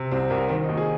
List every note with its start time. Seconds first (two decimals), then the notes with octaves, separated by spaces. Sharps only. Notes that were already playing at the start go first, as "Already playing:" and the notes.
Already playing: C3
0.11 C2 C4
0.30 C2 A#4
0.49 D#3 C4
0.63 D#4
0.68 D#2
0.77 G#4